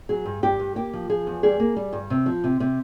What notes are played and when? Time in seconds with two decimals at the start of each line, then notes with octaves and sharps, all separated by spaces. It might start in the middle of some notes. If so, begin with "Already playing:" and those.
0.09 F#3 G#4
0.25 G2
0.43 G2 G4
0.60 G2
0.75 A#3 G4
0.93 F3
1.09 F3 G#4
1.27 E2
1.43 G3 G#4
1.60 A#3
1.76 G3
1.93 G2
2.10 C3
2.26 F3
2.44 C3
2.60 C3